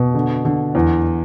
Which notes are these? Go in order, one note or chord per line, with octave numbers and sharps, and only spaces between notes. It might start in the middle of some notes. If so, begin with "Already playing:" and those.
Already playing: B2
D3
D3
E2